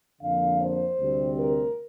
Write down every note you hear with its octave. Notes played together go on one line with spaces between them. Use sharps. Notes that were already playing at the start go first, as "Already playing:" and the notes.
F2 D3 A#3 D4 F5
C5
D2 C3 G3 C4
A#4